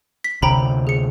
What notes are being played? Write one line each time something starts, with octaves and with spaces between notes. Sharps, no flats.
B6
D2 C3 G5 A#5 B5
G#4 C#7